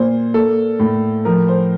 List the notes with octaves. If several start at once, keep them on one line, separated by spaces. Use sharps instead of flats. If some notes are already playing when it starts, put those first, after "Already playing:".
Already playing: A#2 A#3 C5
A#3 A4
A2
F3 A#4
C5